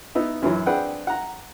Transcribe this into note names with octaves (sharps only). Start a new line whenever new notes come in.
B3 D#4 E4
F#2 E3 F#3
C4 D4 G#4 B4 F#5 G5
F#5 A#5